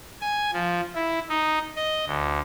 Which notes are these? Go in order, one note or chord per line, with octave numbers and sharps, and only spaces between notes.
G#5
F3
E4
D#4
D#5
D2